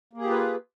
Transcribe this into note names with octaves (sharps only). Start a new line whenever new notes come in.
A#3 F4 G4 G#4 B4